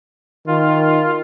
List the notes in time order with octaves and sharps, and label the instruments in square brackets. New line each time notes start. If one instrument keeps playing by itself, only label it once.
[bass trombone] D#3 [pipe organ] F4